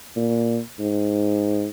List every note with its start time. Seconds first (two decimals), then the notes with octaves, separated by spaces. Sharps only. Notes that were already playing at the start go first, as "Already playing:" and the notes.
0.16 A#2
0.80 G#2